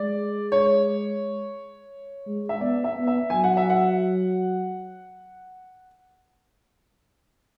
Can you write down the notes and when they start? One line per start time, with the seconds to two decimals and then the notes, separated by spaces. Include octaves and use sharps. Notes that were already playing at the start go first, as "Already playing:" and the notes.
Already playing: G#3 D5
0.52 C#5
2.26 G#3
2.49 E5
2.61 B3 D5
2.84 E5
2.96 B3
3.07 E5
3.30 F#3 G#5
3.44 F#5
3.57 E5
3.70 F#5